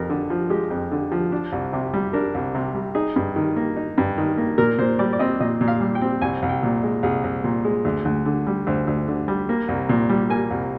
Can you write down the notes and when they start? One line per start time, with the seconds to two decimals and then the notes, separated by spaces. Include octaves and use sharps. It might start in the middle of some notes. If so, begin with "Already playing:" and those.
Already playing: F2 A#4
0.10 D3
0.30 F3
0.50 G#3 G4
0.70 F2
0.91 D3
1.12 F3
1.32 D4
1.52 C2
1.73 C3
1.94 G3
2.13 D4 A#4
2.34 C2
2.55 C3
2.75 G3
2.95 D#4 G#4
3.16 G2
3.36 D#3
3.56 A#3
3.76 D#4
3.98 G2
4.18 D#3
4.37 A#3
4.58 A#2 A#4
4.79 A#2 C5
4.99 G3 D5
5.13 D5
5.19 C4 D#5
5.40 A#2 D#5
5.61 A#2
5.68 F5
5.81 G3
5.95 G5
6.01 C4
6.22 C2 G#5
6.42 C2
6.49 G5
6.63 A#2
6.83 G#3
7.03 C2 G#4
7.24 C2
7.44 A#2
7.64 G#3
7.85 D2
8.05 D2
8.25 D3
8.47 G3
8.67 D2 C5
8.87 D2
9.08 D3
9.28 G3
9.49 A#3
9.68 C2
9.89 A#2
10.09 G3
10.30 A#3 G#5
10.50 C2